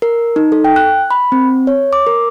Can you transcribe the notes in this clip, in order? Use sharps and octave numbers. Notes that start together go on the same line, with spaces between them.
A#4
D#4
A4
G5
F#6
B5
C4
C#5
D6
A#4